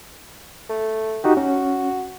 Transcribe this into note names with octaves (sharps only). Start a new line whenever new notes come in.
A3
D#4 F#4 G4
C#4 F#4